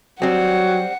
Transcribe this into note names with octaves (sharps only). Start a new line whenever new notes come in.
F#3 G3 C4 F#5